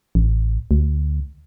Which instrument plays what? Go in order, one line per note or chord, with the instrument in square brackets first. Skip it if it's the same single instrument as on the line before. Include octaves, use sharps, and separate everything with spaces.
[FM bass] A1
D2